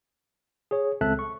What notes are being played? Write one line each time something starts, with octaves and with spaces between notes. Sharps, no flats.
G#4 C#5
C#2 C4 A4 E5 A5 F#6
C#6